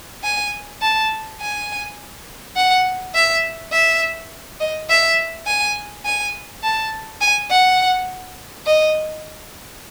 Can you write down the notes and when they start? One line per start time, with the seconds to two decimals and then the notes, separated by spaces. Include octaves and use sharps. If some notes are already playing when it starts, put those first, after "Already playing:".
0.24 G#5
0.82 A5
1.40 G#5
2.56 F#5
3.15 E5
3.72 E5
4.60 D#5
4.89 E5
5.47 G#5
6.05 G#5
6.63 A5
7.21 G#5
7.50 F#5
8.66 D#5